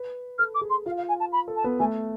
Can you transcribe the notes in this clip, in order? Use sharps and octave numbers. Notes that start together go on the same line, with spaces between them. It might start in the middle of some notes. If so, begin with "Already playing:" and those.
Already playing: B4
A4 F6
D6
G#4
C6
F4 F5
F5
G#5
A5
B5
A4
A5
B3
A3 G#5